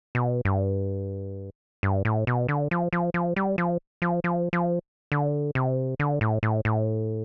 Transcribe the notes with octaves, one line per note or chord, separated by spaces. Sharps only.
B2
G2
G2
A2
B2
D3
F3
F3
F3
G3
F3
F3
F3
F3
D3
C3
D3
A2
A2
A2